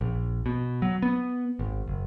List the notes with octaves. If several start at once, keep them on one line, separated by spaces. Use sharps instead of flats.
A#1
B2
F#3
B3
G#1
F#1